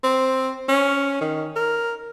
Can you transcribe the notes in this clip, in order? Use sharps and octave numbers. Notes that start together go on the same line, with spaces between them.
C4
C#4
D#3
A#4